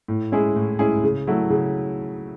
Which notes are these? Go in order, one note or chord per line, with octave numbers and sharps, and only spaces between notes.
A2
G#3 C#4 E4 G#4
A2
G#3 C#4 E4 G#4
C#3
F#3 A3 E4
C#3